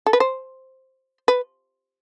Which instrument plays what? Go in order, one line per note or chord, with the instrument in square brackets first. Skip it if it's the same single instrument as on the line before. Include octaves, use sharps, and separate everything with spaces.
[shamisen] A4
B4
C5
B4